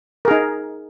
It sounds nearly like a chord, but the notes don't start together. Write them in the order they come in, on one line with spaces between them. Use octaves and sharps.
A#4 G#4 D#4